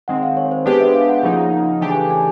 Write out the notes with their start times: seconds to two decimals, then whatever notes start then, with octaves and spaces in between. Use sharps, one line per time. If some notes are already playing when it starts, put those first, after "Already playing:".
0.08 D#3 G#3 C4 F#5
0.23 F5
0.37 C#5
0.51 C5
0.66 G#3 B3 D4 G4 B4
0.80 E5
0.94 F5
1.09 F#5
1.23 C#3 F3 A#3 D#4
1.81 C#3 E3 A3 D4 G4 G5
1.91 G#5
2.10 G#5